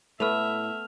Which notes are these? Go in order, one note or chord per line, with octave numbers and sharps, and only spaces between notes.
A2 A3 B3 B4 E5 F6 F7